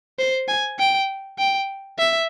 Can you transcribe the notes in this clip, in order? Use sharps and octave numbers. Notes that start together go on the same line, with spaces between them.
C5
G#5
G5
G5
E5